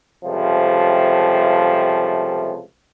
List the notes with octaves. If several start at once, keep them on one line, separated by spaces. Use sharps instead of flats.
C#2 C3 F3 G3 A3